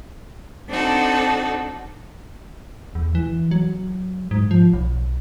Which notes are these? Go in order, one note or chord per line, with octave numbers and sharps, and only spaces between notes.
C4 D4 D#4 F#4 A4
E2
E3
F#3
G#2
F3
B1